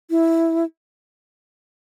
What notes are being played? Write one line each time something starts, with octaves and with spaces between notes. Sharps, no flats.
E4